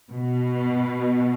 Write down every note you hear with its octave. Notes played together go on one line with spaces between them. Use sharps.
B2